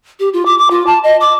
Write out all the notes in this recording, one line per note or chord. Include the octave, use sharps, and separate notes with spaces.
G4
F4
D6
D6
F4
A5
D#5
D6